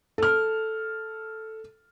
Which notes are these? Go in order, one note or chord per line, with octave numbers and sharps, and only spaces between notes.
A4 F6